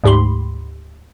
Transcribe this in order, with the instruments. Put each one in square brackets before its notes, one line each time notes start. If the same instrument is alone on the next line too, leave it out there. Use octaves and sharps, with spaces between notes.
[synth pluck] D2 G#2 G4 B5 C6